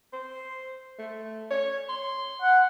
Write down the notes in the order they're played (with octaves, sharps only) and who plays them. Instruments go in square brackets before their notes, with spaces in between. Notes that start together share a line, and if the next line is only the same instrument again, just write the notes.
[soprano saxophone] C5
A3
C#5
C6
[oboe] F#5